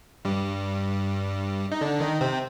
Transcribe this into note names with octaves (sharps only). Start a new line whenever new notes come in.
G2 G3
D#4
D3 D4
D#3 D#4
C3 C4